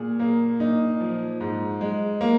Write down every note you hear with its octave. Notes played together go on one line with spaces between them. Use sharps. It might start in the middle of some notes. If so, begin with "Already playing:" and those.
Already playing: A#2 G#4
A#3
A#2 D#4
F3
G#2
G#3
A#3